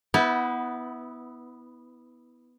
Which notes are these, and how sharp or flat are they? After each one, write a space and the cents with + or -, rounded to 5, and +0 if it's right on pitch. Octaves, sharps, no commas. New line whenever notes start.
B3 +0 E4 -25 C5 -45